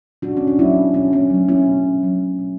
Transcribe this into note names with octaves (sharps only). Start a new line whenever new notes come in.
B2 D4 F#4
C#4
D4
F#3 A3 C#4 E4
B2 C#4
C#4
F#3 A3
C#4 E4
B2
F#3 A3
B2